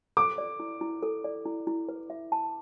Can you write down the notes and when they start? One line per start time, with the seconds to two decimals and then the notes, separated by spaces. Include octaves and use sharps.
0.17 A4 D6
0.38 D5
0.60 E4
0.81 E4
1.03 A4
1.24 D5
1.46 E4
1.67 E4
1.89 B4
2.10 E5
2.32 A5